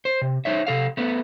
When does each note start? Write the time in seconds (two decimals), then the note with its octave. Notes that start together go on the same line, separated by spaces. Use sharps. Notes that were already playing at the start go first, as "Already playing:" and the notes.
0.05 C5
0.22 C3
0.45 D#4 C5 C#5 E5
0.67 C3 A4 F5
0.97 A3 B3 B4